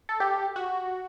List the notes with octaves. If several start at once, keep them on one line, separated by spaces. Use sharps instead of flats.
A4
G4
F#4